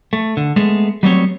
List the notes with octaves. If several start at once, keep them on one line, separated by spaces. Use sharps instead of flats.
A3
D3
G#3 A3 B3
F#3 G3 A3 B3 C4 C#5